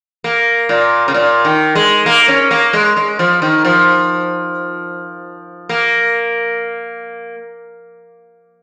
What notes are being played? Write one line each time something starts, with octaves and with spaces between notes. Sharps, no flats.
A#3
A#2
C#3
A#2
D#3
G#3
A#3
C#4
A#3
G#3
G#3
F3
D#3
F3
A#3